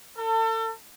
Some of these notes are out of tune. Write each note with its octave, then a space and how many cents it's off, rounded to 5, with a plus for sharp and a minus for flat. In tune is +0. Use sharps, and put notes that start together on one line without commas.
A4 +35